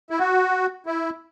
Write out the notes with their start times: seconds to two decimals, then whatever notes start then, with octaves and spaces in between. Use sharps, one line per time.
0.10 E4
0.19 F#4
0.86 E4